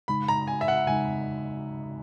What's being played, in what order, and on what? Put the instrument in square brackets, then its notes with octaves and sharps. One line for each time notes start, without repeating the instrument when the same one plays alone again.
[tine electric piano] C#3 G#3 D#4 [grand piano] B5
[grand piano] A#5
G#5
E5
F#5
[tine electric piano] C#3 G#3 D#4 [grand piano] G#5